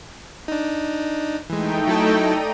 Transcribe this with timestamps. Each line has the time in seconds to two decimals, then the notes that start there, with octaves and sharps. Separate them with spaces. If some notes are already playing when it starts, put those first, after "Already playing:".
0.48 D4 D#4
1.50 E3 G#3 A3 D#4 G5
1.88 F#3 E4 A4
2.19 D5 A#5 D#7